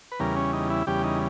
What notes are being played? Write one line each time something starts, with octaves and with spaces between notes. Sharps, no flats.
B4
E2 C#3 G3 A#4
C#4
D#4
E4
E2 C#3 G3 G4
D#4